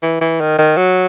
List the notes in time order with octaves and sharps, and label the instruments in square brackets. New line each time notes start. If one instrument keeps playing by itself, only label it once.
[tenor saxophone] E3
E3
D#3
D#3
F#3